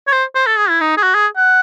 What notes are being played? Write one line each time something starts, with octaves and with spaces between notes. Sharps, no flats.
C#5
C5
C5
A4
G#4
E4
D#4
G#4
F#4
G#4
F#5